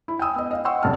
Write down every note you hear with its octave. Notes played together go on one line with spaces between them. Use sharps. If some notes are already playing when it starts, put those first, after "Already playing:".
E4
G5 G#5 D#6 E6
B3 D#5
D#5 F5
F#5 G5 C6 C#6 E6
F1 B1 C#4 A5 F6